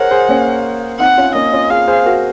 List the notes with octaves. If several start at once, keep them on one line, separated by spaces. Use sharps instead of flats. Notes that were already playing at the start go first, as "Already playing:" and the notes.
Already playing: G#4 A#4 C5 C#5 F#5
G#4 C5
A#3 C#4
C4 D#4 F#5
C#4 F4
A#3 C#4 D#5
C#4 F4
F4 G#4 F5
G#4 C5
F#4 A#4